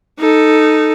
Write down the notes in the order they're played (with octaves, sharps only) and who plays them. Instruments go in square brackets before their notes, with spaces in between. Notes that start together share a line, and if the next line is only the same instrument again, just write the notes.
[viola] D#4 A4